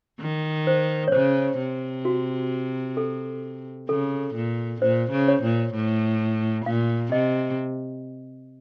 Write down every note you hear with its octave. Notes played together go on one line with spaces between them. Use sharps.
D#3
C5
C#5
C#3 C5
C3
F#4
A4
C#3 A4
A#2
A#2 C5
C#3
C#5
A#2
A2
A#2 F5
C3 D#5